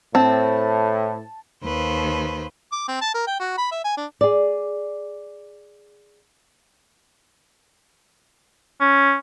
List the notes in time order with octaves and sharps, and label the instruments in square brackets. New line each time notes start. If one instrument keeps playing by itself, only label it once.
[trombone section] A2 [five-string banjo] C4 [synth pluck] A5
[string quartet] D#2 B4 C5
[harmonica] D6
C4
A5
A#4
G5
F#4
B5
E5
G#5
D4
[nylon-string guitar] G#4 D5
[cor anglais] C#4